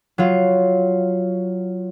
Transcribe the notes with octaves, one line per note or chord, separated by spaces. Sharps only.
F#3 F4